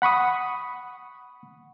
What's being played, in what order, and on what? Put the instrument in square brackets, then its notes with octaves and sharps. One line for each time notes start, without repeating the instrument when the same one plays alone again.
[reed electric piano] F#5 B5 C#6 D#6